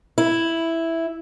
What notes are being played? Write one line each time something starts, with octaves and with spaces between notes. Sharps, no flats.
E4